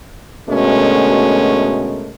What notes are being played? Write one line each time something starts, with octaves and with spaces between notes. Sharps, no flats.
D2 B2 G#3 A3 C#4 A#4